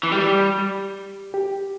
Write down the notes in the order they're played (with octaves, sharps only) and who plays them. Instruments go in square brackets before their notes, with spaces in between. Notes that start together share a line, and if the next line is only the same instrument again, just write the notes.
[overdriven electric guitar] E3
[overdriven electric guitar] G3 [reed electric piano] G4
[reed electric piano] G4